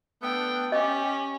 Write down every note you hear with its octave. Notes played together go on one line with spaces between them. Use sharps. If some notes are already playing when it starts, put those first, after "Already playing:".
A3 B3 D4 G5
C#4 G4 D#5